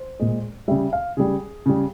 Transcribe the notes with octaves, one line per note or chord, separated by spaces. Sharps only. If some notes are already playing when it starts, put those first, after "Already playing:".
Already playing: C5
A#2 G#3
C#3 G3 E5
F5
C#3 G3 G#4
C#3 G3